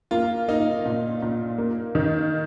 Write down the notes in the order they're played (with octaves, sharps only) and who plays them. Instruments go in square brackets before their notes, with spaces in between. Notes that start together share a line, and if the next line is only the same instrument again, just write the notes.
[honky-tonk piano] A#3 [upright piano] F4
[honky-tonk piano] A#3 [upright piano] D#4
[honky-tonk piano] A#2
A#2
A#3
D#3